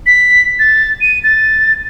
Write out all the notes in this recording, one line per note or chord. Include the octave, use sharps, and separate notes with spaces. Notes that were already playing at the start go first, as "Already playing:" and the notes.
B6
A6
D#7
A6